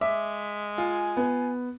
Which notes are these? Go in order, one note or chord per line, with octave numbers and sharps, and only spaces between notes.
G#3 E5 D6
F4 G#5
B3